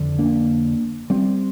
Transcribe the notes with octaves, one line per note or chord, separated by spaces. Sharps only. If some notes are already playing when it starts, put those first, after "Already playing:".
Already playing: F2 D3
A#3 D4
G3 C4